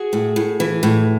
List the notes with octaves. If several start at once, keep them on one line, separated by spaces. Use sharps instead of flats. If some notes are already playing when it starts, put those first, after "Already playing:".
Already playing: F#4 G#4
A2
A2
E3
A2